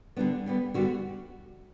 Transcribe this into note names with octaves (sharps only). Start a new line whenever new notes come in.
D3 G3 B3 D4
D3 G3 B3
D3 G3 B3 F#4